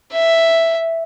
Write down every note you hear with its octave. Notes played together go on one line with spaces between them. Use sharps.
E5